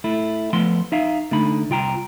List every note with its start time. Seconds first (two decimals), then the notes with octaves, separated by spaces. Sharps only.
0.04 A3 E4
0.53 F3 A3 B3 C6
0.92 D#4 E5 F5
1.31 D3 A3 D#4 B5
1.70 C2 F4 G5 A#5